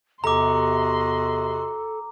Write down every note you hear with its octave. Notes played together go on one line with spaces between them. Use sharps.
E2 C3 F#4 A4 D#5 A#5 C6 D6